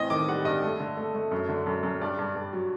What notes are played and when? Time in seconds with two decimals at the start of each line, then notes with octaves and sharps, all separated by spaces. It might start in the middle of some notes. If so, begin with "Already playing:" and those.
Already playing: A1 C4 D#5
0.10 D#3 D6
0.28 G3 F#5
0.45 G2 D#5
0.63 A3
0.80 D3
0.97 A3
1.14 A3
1.31 F#2
1.49 D3
1.67 F#2
1.83 F#2
2.01 G2 D5
2.19 G2
2.36 G2
2.53 F#3